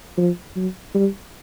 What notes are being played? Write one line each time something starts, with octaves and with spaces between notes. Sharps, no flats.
F3
F#3
G3